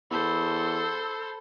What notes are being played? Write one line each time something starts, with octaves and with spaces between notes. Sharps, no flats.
E2 A4 C5 A5 B5 E6